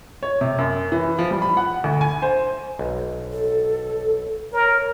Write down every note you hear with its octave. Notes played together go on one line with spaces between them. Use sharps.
C#5
C3
F#2
E3
F3
G3
B5
F#5
D2
G#5
C5
B1
A4
A#4 C#5